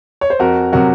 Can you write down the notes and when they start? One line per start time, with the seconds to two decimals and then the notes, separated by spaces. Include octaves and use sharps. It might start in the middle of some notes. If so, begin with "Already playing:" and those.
0.21 C#5
0.30 C5
0.39 F2 F#4 A#4
0.72 C3 F#3 F#4 A#4